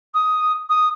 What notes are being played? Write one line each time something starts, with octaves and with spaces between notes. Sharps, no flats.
D#6
D#6